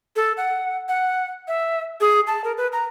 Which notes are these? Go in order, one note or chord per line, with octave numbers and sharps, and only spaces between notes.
A4
F#5
F#5
E5
G#4
A5
A#4
B4
A#5